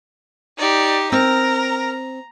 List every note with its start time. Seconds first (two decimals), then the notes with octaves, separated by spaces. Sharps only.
0.58 D#4 G4 D5
1.12 C4 A#4 A#5